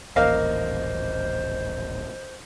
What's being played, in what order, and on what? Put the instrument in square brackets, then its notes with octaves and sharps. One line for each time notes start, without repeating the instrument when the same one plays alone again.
[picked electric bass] D#1 A1 [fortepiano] A#3 F5 [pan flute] C5 [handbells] D#5